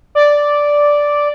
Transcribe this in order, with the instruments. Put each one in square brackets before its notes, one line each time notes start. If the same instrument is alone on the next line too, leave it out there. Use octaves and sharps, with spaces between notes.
[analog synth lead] D5